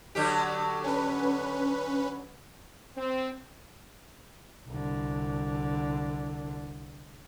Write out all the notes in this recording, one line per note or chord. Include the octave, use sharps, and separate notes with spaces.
D3 F#3 G4
C#4 B4
C4
C2 D3